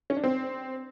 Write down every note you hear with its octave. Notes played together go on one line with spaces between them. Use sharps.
C#4
D4
C4